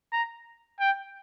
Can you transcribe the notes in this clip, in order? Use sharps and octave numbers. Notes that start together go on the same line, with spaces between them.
A#5
G5